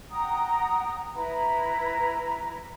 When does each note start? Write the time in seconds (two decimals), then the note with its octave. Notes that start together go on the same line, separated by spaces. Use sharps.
0.10 F#5 G5 A#5 D#6
1.14 E4 B4 A#5 B5